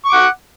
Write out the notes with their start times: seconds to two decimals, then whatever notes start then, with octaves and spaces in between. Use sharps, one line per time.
0.05 C#6
0.09 D6
0.13 F#5